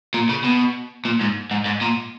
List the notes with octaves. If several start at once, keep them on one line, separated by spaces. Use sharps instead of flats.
A#2
C#3
B2
A#2
G#2
G#2
G#2
A#2